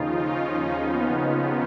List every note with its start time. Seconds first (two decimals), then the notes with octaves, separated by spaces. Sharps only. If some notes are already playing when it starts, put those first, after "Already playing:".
Already playing: D#2 C#3 F3 D#4 F4
0.19 C#4
0.84 B3
1.16 B3